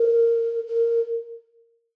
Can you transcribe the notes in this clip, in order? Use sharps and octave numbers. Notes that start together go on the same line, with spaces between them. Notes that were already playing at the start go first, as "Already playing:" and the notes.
Already playing: A#4
A#4